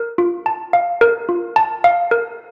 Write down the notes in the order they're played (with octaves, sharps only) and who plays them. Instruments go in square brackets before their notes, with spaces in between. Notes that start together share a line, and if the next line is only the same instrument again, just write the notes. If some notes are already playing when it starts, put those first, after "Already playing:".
Already playing: [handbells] A#4
F4
A5
F5
A#4
F4
A5
F5
A#4